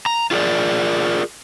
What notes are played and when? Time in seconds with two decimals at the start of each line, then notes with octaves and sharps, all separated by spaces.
0.06 A#5
0.31 F4 G#4 A#4 D5